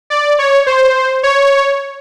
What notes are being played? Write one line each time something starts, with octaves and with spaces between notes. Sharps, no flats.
D5
C#5
C5
C#5